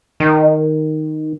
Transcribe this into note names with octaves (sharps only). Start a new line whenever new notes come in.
D#3